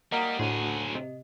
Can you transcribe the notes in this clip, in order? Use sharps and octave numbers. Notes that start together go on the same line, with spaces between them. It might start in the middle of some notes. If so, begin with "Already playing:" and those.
G3 A#3 D#5 F#5 A#5 D#6
D2 A2 F#3 G#4
C3 D#5